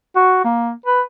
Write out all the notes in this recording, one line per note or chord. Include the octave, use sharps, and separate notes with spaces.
F#4
A#3
B4